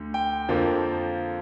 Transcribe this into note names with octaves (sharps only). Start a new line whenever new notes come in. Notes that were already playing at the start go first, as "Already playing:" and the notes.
Already playing: D2 D3
G5
F2 D3 F3 A#3